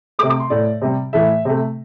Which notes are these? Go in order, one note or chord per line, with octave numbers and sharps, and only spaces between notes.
C3 A3 D6
D6
C6
A2 A3 D5
C3 G3
A2 E3 A3 E5
C3 A3